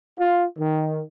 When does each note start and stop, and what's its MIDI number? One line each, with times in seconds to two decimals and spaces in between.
0.19 0.44 65
0.59 1.03 51